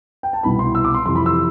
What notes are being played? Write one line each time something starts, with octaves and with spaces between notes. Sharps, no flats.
G5
A5
C2 B2 B3 E4 B5
C6
E6
D6
C6
F2 C3 E3 C6
B5
E6